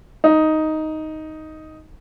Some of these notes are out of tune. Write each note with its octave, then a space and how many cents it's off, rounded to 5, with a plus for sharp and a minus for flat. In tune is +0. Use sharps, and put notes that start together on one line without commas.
D#4 +5